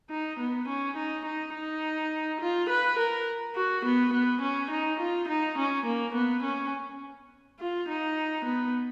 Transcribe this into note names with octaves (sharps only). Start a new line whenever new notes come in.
D#4
B3
C#4
D#4
D#4
D#4
F4
B4
A#4
F#4
B3
B3
C#4
D#4
F4
D#4
C#4
A#3
B3
C#4
F4
D#4
B3